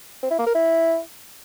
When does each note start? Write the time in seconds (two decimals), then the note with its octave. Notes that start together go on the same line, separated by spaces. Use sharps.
0.23 C4
0.31 E4
0.39 A#3
0.47 A#4
0.55 E4